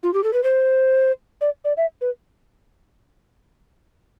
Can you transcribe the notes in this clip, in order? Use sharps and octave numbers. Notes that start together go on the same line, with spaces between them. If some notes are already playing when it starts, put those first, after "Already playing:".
F4
G4
A4
B4
C5
D5
D5
E5
B4